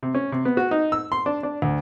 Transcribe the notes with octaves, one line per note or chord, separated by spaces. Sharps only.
C3
C#4
C3
B3
F#4
D#4
E6
C6
D4
D4
D2